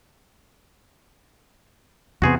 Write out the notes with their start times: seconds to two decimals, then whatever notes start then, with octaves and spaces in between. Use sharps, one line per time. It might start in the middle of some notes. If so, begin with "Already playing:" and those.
2.22 E2 C3 B3 F#4 G#4 C5